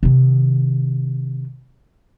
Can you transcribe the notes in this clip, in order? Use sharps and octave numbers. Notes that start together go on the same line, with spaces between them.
C3 D#3